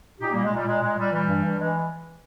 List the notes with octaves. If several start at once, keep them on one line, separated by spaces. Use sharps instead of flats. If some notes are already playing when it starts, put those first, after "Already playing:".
A#2 D#4 G4
A#2 G3 A#3
G#3
A#2 G3
A#2 G#3
A#2 G#3
A#2 G3
E3 G3
G2
G2
E3 G#3